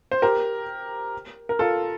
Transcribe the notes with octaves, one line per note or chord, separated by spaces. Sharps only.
C5
G4 A#4
A#4
F4 A4